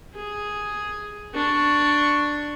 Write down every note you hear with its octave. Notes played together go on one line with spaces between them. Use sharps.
G#4
D4 C#6